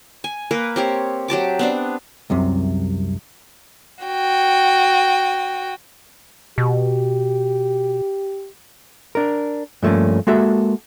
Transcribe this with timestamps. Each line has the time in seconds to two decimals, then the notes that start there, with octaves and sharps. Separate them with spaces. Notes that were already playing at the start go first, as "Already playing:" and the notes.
0.24 G#5
0.51 A#3 A#4 B4
0.76 C4 G4 C#5
1.28 F#3 G4 A5 D6
1.59 B3 C4 D4
2.30 C2 F#2 C3
4.04 F#4 G5
6.58 B2 G4
9.15 D4 A#4
9.83 G2 F3 A3 A#3 C#4
10.27 G#3 A#3 F#4 A4 E5